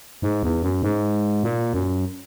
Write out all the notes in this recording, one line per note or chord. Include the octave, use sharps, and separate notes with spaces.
G#2
E2
F#2
G#2
A#2
F#2